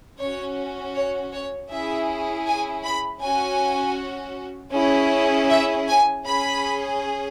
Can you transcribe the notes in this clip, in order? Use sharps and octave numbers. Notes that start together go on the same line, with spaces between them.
C#4 F#4 C#5
C#5
C#5
C#4 E4 G#4 E5
G#5
B5
C#4 F#4 G#5
C#4 E4 G#4
E5
G#5
C#4 G#4 B5